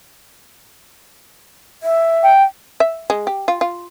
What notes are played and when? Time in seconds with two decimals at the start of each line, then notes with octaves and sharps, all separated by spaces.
1.83 E5
2.23 G5
2.80 E5
3.10 G#3
3.27 G4
3.48 F4
3.61 F4